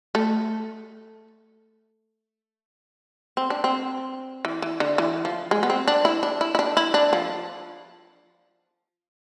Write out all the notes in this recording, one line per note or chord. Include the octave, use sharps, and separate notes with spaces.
A3
C4
D4
C4
E3
E3
D3
E3
F3
G#3
B3
C4
D4
E4
D4
E4
E4
D4
E4
D4
F3